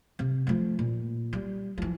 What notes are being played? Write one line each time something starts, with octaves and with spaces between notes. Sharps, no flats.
C3
F3 A3
A#2
G3
E3 F3